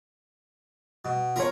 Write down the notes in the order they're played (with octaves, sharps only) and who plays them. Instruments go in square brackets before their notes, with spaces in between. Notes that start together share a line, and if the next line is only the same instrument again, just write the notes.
[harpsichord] B2
[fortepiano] F4 C#5 [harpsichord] A#4 A#5 B5